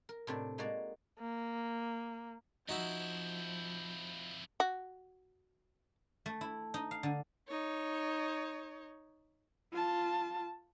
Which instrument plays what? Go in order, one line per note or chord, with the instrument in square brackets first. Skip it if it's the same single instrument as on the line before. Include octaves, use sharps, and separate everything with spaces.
[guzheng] A#4
A2 C3 D4 D5
G#3 A#3 D#4 F#4 D5 A#5
[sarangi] A#3
[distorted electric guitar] F2 E4 [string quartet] F3 G6 [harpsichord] D#4 F#4 E5
[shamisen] F#4
[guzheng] A3
E4
D#4
F5
D3
[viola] D#4 C#5
[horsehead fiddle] F4 A5